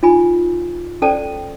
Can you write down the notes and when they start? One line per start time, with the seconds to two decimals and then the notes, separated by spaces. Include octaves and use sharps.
0.03 D#4 F4 G#5 B5
1.02 C#4 A4 C5 D5 G5 A5